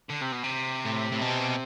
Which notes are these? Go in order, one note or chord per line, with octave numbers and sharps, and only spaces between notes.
D3
C3
B2
C3
A2
A2
B2